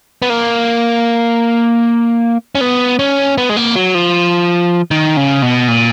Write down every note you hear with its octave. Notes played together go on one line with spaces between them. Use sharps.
B3
A#3
C#4
B3
C#4
B3
G#3
A#3
F#3
F3
D#3
C#3
B2
A#2